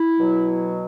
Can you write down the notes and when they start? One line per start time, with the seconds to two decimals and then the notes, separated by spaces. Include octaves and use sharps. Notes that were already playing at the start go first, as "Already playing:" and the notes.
Already playing: E4
0.19 B2 F#3